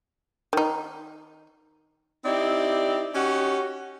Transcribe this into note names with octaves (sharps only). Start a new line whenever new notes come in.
D#3 D#4
C4 D#4 E4 G4 D5
C#4 D#4 F#4 G4